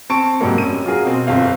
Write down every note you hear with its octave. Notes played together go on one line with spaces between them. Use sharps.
C4 A5 C#6 D7
G#2 C3 F#3 G3 A#3
F#2 D#7
F4 F#4 G#4 A#4
B2 C4
G1 C4 F5